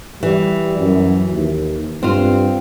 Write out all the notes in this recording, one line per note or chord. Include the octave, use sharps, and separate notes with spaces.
E3 G3
F#2
D#2
G2 C4 F4